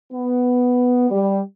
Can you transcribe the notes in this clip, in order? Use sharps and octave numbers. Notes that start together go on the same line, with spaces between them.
B3
G3